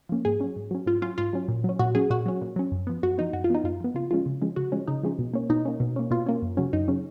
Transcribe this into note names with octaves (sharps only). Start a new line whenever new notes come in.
F3 A#3 C#4
G#2 G#4
F#3 C#4
G#2
F#3 C#4
G#2 F4
F#3 C#4 F4
G#2 F4
F#3 C#4
A#2
F#3 C#4
A#2 F#4
F#3 C#4 G#4
A#2 F#4
F#3 C#4
A#2
F#3 C#4
F#2
F3 B3
F#2 F#4
F3 B3 D#4
F#2 F#4
F4
F3 B3 D#4
F#2 F4
F3 B3
C#3 F4
F3 G#3 C#4 F4
C#3
F3 G#3 C#4
C#3 F#4
F3 G#3 C#4
C#3 D#4
F3 G#3 C#4
B2
A#3 C#4
B2 D#4
A#3 C#4
B2
A#3 C#4
B2 F4
A#3 C#4
F#2
C#3 F#3 C#4
F#2 D#4
C#3 F#3 C#4